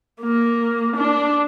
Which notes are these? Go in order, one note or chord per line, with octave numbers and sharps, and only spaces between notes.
A#3
D4